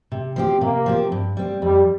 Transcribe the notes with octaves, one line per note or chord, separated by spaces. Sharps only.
C3
F3 C4 G4
C3 A#3
F3 C4 G4
G2
G3 C4
F2 G3